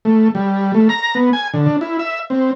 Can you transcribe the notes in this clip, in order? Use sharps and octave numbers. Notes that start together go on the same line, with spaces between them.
A3
G3
A3
A#5
B3
G#5
D3
D4
E4
E5
C4